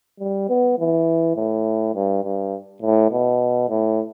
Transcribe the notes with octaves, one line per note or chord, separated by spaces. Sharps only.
G3
B3
E3
A2
G2
G2
A2
B2
A2